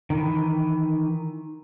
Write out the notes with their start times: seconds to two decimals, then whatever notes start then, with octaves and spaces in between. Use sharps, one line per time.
0.10 D#3 E3